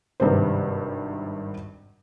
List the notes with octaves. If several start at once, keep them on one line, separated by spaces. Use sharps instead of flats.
G#1 G2 C3 C5